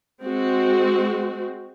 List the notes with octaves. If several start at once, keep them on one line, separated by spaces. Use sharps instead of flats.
G#3 C4 F#4